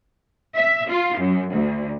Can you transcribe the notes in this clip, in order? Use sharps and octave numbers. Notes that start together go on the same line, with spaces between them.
E5
F4
F#2
D2